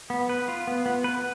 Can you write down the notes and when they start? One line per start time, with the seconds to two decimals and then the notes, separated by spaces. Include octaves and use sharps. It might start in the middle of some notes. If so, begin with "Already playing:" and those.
0.10 B3
0.29 B4
0.48 F4
0.67 B3
0.86 B3
1.04 B4